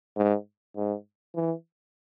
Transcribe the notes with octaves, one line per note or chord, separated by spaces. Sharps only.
G#2
G#2
E3